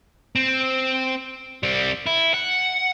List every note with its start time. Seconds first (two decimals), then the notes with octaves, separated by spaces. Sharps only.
0.36 C4
1.63 G3 C4
2.06 E4
2.34 F#5